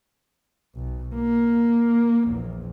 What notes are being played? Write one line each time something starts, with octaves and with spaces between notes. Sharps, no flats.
B1
A#3
A#1 E2